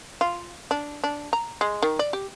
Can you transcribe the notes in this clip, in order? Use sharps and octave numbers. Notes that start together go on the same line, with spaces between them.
F4
D4
D4
A#5
G#3
D#3
D5
G4